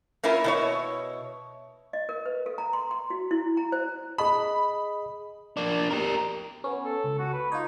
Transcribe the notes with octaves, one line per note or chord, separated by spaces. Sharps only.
A#3 C#4 E4 F4 A#4
B2 E4 C#5
D#5
A#4
B4
A4
A#5
C6
C6
F#4
E4
A#5
C5
G#4 D#5 B5 D#6
A#3 D4
G4 A#4
B3 C#4
A4
C#2
F#4
B4
D#4 F4 C#5